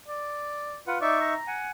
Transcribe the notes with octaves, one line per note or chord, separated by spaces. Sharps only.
D5
F4 B4 F#5
D#4 D5 E5 C#6
A#5
F#5 G#5